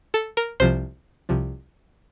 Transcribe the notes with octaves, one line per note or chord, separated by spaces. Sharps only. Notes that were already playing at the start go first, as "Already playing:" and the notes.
A4
A#4
C2 C3 F3 C5
C2 C3 F3